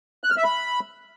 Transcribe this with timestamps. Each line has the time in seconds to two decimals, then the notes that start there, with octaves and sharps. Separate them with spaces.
0.24 F#6
0.31 F6
0.37 E5
0.44 B5